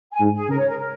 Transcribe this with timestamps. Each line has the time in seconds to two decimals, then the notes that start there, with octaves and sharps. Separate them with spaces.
0.12 G#5
0.21 G#2
0.35 G#4
0.49 C#3 A#4
0.58 C#5
0.68 A#4
0.78 A#4